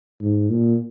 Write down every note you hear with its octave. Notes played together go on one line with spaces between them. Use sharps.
G#2
A#2